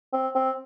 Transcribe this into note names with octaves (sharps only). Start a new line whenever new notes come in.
C4
C4